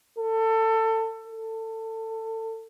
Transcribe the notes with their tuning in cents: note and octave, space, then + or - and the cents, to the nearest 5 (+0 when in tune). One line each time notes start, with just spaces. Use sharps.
A4 +25
A4 +25